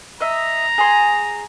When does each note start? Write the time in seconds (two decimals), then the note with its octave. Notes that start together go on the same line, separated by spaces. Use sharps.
0.20 D#5 E5 A#5
0.78 G#4 C6